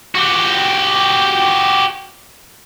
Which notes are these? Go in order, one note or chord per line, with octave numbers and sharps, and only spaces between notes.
F#4 G4